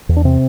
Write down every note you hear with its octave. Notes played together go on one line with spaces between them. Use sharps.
E2
D4
C3 C4